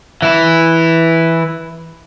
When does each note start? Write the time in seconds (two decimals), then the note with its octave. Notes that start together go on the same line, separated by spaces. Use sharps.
0.22 E3 E4